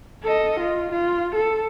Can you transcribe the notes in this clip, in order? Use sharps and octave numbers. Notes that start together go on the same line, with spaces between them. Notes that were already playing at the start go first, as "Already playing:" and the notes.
A4 D#5
F4
F4
A4